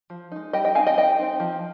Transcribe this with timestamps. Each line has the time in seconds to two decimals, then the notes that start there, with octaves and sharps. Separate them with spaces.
0.10 F3
0.32 G#3 D#4
0.53 G3 D#5 G5
0.65 D#5 G5
0.75 C4 F5 G#5
0.79 D#4
0.87 D#5 G5
0.97 G3 D#5 G5
1.19 C4 D#4
1.40 F3